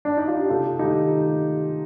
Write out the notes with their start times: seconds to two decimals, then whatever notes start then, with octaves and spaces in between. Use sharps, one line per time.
0.05 D4
0.17 D#4
0.28 F4
0.39 G4
0.50 C3 F4 A4
0.79 D#3 A3 D#4 G4